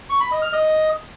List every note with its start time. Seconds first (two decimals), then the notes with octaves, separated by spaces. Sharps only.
0.10 C#6
0.20 B5
0.31 D#5
0.42 F6
0.53 D#5